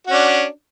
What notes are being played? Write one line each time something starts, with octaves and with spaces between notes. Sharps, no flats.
C#4 D4 F#4